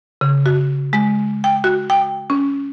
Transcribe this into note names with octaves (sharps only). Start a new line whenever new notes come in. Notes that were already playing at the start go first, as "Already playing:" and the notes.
C#3
F#4
G#3
G5
F#4
G5
C#4